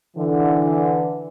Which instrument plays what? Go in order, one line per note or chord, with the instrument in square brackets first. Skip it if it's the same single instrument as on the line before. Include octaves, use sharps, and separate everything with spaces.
[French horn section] D3 E3